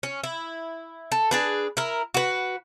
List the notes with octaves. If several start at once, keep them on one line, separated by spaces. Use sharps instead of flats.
C#4
E4
A4
D4 G#4 B4
E4 A#4
F#4 B4